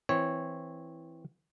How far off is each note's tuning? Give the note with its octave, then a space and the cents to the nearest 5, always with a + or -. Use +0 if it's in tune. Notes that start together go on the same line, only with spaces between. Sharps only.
E3 +0 C4 +0 C#5 -10